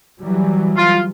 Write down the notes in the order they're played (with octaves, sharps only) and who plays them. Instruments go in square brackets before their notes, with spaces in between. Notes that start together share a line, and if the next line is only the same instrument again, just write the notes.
[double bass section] E3 F#3 G3
[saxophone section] F4